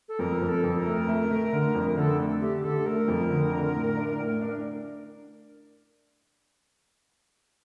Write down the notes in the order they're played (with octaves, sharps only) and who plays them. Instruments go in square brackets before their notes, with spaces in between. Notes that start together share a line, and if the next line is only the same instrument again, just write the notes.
[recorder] A4
[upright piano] F2 [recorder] A#4
[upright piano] F2
[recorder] A4
[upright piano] F2
[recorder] A#4
[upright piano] A3
A3
A3
D3
F2
[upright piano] D3 [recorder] A4
[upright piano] A3
[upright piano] A3 [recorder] G4
[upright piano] D3 [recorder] A4
[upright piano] A3 [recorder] A#4
[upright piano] F2
D3
D3
A2
D4
A2
D4